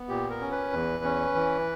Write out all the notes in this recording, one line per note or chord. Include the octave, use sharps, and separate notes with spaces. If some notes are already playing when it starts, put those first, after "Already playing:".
Already playing: B3
A#2 G4
A#4
C#4
B4
E2
C#4
E3